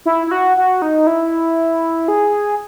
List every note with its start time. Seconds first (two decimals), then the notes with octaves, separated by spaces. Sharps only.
0.06 E4
0.27 E4
0.31 F#4
0.57 F#4
0.82 D#4
1.07 E4
2.08 G#4